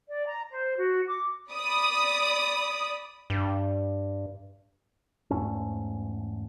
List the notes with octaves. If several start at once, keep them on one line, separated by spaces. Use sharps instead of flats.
D5
A#5
C5
F#4
D6
D5 B5 D#6
G2
E2 G#2 A3 C#4